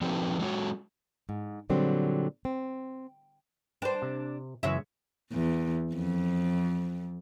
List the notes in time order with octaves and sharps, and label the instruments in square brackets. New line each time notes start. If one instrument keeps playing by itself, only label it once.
[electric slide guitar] F3 C4 D4 D#4 F#4 B4
F#3 G#3 C#4 F#4 C#5
[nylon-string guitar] G#2
A#2 D3 F#3 G3 C4
C4
[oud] D4 C5 [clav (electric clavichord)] B4 G5
[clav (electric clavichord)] C3
[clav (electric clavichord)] F#2 C#3 E3 [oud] G#3 C#5 E5
[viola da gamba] E2
F2